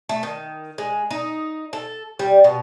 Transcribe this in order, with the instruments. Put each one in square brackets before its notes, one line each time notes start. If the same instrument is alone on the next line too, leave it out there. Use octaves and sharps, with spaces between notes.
[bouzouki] A3
D#3
G#3
D#4
A4
G3
B2